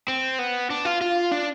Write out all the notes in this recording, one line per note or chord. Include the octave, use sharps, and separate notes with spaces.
C4
B3
D4
F4
F4
D4